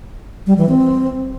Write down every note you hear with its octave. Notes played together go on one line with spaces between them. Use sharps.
G3
E3
C4